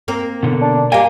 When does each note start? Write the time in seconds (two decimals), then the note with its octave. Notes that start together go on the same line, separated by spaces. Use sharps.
0.08 A#3 C4 A#4
0.43 B2 D3
0.62 D4
0.92 G3 A#3 G4 D#5 G5 G#5